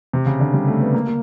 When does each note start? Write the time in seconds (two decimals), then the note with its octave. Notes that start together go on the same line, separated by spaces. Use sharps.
0.13 C3
0.26 C#3
0.40 D3
0.54 G3
0.67 A3
0.81 B3
0.94 A#3
1.07 A#3